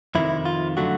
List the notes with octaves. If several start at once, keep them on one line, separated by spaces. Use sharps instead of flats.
F2 C3 D#3 E4
F4
D3 F#3 A3 F#4